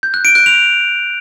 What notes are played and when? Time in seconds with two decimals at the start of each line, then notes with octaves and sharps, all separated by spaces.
0.03 G6
0.14 F#6
0.25 D7
0.35 F#6
0.46 F7